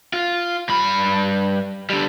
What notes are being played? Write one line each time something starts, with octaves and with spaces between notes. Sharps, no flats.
F4
G2 B5
D3 G3